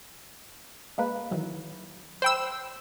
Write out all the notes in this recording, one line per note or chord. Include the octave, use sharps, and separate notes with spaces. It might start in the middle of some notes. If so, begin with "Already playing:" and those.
G#3 A#3 B4
D#3 E3 F#3
C5 G5 B5 E6 F#6